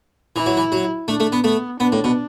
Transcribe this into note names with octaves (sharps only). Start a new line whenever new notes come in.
E3 E4
F#3
E3
F#3
A3 D4
A3
B3
A3 B3
B3 D4
A2
B2